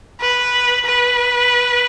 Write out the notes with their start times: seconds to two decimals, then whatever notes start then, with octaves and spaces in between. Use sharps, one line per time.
0.21 B4
0.86 B4